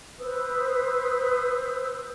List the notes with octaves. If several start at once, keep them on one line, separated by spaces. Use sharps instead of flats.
B4 C5 D#6 E6